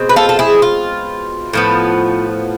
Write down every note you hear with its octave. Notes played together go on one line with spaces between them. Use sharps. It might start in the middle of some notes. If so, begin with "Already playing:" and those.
Already playing: B2 G#3 C4
B4
F4 A4
A4
E4 G#4
F4
A2 F3 B3